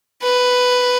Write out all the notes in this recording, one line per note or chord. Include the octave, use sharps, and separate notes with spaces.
B4